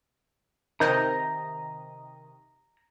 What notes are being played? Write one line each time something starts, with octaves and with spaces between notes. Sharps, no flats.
C3 D#3 D#5 A#5 G6